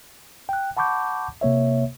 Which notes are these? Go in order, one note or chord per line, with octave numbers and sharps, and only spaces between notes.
G5 F#6
F#5 A5 B5 C#6 D6 G6
C3 A#3 C#5 E5